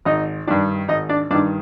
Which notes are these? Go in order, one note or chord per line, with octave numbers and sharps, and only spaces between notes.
G#1 D#4 D#5
G2 D#3 D4 D5
G#1 D#4 D#5
D4 D5
G2 D#3 D4 D5